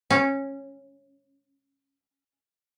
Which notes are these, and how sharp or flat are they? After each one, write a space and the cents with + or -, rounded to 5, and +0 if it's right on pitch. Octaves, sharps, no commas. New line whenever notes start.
C#4 -15